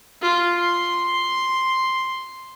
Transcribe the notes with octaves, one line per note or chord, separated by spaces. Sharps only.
F4
C6